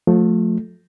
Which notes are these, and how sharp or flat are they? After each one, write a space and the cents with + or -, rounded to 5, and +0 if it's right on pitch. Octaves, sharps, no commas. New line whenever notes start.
F3 +35 A3 +0